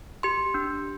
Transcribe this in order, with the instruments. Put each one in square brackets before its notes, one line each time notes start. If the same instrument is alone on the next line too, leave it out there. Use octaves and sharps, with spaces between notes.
[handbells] G4 C6
D4